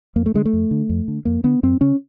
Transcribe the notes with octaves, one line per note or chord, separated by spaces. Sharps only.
F2 A#3
A3
D3 G#3
A3
F2
D3
F2
D3
F2 A#3
D3 B3
F#2 C4
C#3 C#4